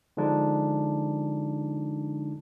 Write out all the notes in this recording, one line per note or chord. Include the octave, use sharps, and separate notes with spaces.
D3 F3 G#3 D4 D#4